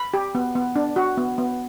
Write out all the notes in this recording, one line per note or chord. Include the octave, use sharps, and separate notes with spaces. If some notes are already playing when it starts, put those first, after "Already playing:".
Already playing: B5
G4
B3
B3
D4
F#4
B3
B3